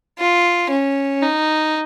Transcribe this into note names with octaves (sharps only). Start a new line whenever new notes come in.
F4
C#4
D#4